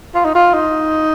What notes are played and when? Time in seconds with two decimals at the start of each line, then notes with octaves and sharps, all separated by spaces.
0.15 F4
0.25 D#4
0.35 F4
0.54 D#4